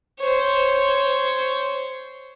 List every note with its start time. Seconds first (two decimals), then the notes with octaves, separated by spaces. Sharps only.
0.20 C5 C#5